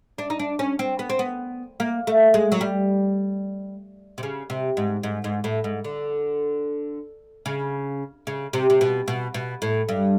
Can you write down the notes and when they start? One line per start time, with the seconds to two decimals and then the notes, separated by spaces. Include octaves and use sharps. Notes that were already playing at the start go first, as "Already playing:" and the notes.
0.18 D4
0.30 D#4
0.39 D4
0.59 C#4
0.79 C4
0.99 B3
1.09 C4
1.19 B3
1.80 A#3
2.07 A3
2.34 G#3
2.52 F#3
2.61 G3
4.18 C3
4.23 C#3
4.50 C3
4.77 G#2
5.03 G#2
5.24 G#2
5.44 A2
5.64 G#2
5.84 D3
7.46 C#3
8.27 C#3
8.53 C3
8.70 C3
8.81 B2
9.08 B2
9.34 B2
9.62 A2
9.89 G2